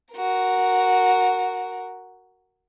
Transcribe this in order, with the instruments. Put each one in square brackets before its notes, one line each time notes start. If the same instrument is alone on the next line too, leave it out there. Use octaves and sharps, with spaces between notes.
[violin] F#4 A#4